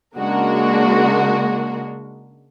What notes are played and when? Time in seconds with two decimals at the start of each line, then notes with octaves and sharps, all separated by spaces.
0.17 C#3 G#3 A#3 D4 F#4 A#4